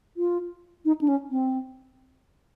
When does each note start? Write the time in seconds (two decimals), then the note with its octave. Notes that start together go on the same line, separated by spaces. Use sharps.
0.17 F4
0.85 D#4
1.01 D4
1.08 C#4
1.31 C4